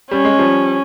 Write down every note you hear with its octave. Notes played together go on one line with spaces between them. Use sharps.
G3 C#4
G#3
F3 G3